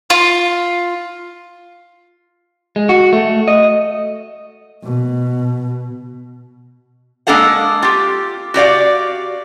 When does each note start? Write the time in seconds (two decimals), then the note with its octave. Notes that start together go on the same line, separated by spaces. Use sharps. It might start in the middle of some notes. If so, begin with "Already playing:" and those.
0.10 F4
2.76 G#3
2.89 F#4
3.13 A3
3.48 D#5
4.84 B2
7.27 G#3 A#3 D4 A4 F5 F#5
7.83 F4 G4
8.54 F#4 G4 D5 F5